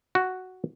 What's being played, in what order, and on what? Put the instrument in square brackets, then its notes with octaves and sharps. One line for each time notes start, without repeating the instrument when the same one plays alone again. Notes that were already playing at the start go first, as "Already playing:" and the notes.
[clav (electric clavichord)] F#4